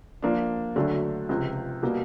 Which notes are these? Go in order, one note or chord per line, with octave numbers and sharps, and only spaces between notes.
F3 A#3 D4
D2 D3 F#3 A3 D4
C#2 C3 F3
B2 G3 A#3